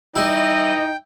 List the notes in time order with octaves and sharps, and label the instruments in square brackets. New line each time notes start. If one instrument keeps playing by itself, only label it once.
[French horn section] E3 D#5 [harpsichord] G3 E4 [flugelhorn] D#4 [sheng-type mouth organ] G5